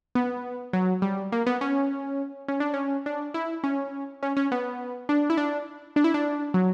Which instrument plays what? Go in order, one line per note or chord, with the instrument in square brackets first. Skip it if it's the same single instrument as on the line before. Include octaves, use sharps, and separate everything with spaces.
[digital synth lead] B3
F#3
G3
A#3
B3
C#4
C#4
D4
C#4
D4
E4
C#4
C#4
C#4
B3
D4
E4
D4
D4
E4
D4
F#3